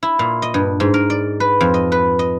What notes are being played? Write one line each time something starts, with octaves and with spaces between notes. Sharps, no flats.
E4
A#2
D#5
G2
G#2
A#4
D5
B4
F2
D#5
B4
D#5